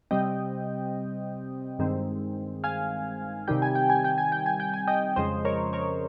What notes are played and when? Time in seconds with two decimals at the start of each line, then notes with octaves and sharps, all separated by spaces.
0.11 C3 G3 C4 D#5 G5
1.79 G2 D#3 G#3 C4
2.64 F5 G#5
3.48 C3 D#3 G3 G5
3.62 G#5
3.75 G5
3.90 G#5
4.04 G5
4.18 G#5
4.32 G5
4.46 G#5
4.60 G5
4.74 G#5
4.88 D#5 G5
5.16 F2 C#3 F3 G#3 C5 D#5
5.45 A#4 C#5
5.73 A#4 C#5